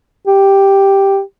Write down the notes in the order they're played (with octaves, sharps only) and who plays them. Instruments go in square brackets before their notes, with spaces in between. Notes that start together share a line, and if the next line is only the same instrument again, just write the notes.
[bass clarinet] G4